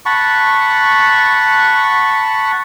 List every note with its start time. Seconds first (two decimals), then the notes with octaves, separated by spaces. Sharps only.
0.06 F#5 A5 B5 C#6